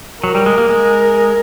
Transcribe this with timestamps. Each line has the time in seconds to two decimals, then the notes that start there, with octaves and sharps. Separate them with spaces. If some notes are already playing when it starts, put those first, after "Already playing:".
0.23 F#3 A#4
0.35 G3
0.46 G#3
0.58 A#3
0.69 G#3